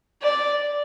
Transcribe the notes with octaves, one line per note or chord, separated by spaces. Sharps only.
D5